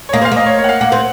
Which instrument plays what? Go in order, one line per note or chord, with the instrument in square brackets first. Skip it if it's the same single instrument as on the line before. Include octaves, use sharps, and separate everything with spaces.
[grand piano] C#5
[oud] A#3 [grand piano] D#5
[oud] C4 [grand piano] F5
[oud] A#3 [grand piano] D#5
[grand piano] C#5
C#5
F#5
F5
[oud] A#3 [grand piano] F#5
[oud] C4